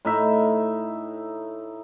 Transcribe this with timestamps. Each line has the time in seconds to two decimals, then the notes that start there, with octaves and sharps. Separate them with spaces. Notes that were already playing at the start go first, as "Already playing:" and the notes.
0.05 A2 D#4 E5